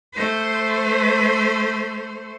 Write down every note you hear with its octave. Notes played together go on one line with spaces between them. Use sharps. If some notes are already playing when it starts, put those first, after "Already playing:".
A3 C5